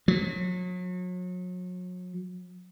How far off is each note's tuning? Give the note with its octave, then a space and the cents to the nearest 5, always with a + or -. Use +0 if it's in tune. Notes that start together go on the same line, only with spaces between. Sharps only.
F#3 -35